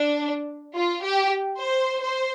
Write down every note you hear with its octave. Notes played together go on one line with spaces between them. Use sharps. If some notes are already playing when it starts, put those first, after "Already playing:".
Already playing: D4
F4
G4
C5
C5